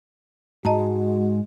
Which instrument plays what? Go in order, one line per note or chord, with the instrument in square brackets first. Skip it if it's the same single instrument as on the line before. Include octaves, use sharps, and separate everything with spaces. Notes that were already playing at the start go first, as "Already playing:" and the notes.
[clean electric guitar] G#2 [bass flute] G#3 [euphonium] F#4 [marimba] D#5 A5 A#5